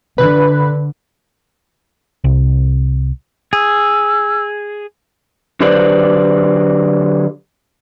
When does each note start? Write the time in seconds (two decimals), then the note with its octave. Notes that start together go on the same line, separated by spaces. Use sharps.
0.18 D3 B4
2.24 C2
3.53 G#4 E6
5.60 D3 F#3 G4 B4 C5 D5